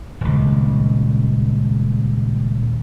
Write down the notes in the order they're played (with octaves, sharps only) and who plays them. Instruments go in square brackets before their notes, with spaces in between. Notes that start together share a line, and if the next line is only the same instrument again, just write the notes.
[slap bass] D#1 C#2